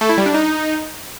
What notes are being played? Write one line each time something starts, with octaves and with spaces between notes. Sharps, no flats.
A3
E4
G3
D4
D#4